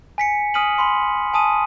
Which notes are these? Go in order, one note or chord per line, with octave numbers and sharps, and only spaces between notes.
G#5 B6 C#7
G#5 D#6 F6 B6 D#7 F#7
B5 C6
G#5 A5 D#6 D#7